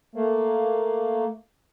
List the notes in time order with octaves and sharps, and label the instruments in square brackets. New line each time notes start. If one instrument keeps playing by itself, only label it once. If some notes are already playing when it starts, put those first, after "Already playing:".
[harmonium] A3 A#3